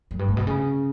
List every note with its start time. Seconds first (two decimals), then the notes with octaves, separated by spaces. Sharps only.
0.11 F#2
0.19 G2
0.28 A2
0.37 B2
0.47 C#3